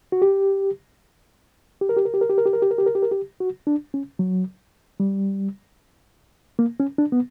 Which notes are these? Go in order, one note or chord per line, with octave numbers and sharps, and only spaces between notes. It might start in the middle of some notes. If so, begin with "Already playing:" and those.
F#4
G4
G4
A#4
G4
A#4
G4
A#4
G4
A#4
G4
A#4
G4
A#4
G4
A#4
G4
A#4
G4
F#4
D4
C#4
F#3
G3
A#3
C#4
D4
B3